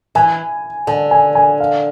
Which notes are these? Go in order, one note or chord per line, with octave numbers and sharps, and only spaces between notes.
E3 G#5
D3 A5
G#5
G#5
F5